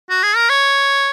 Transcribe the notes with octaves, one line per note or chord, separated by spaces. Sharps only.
F#4
G#4
A#4
C#5